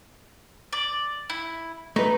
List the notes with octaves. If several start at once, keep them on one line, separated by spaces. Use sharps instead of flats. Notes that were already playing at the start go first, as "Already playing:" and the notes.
D5
E4
A3 D#4 B4